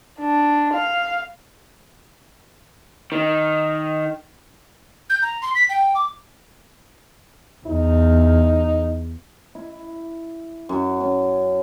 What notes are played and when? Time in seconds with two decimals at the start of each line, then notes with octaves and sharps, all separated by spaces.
0.20 D4
0.74 F5
3.12 D#3
5.10 G6
5.22 A#5
5.42 C6
5.55 B6
5.69 G5
5.95 D6
7.67 E2 D#4
9.55 E4
10.69 F#2
11.00 C#4